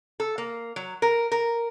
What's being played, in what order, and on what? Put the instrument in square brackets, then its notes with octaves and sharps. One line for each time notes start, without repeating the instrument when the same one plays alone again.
[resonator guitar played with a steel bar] A4
A#3
F#3
A#4
A#4